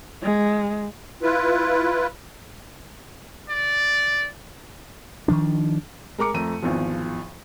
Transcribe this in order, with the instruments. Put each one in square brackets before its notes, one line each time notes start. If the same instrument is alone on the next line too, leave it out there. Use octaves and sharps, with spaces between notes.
[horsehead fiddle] G#3
[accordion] E4 F4 B4
[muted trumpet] D5
[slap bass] D#3 F3 D4
[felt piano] G#3 A#4 A#5 D6 C#7
F2 A3 A#5 D#7
G#1 E2 F3